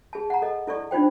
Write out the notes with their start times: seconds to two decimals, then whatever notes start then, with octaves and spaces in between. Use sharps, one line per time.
0.13 G#4 A5
0.30 F#5 A#5
0.42 A4 D#5
0.67 E4 A4 D5 C#6
0.91 D4 D#4 F4 C5 G5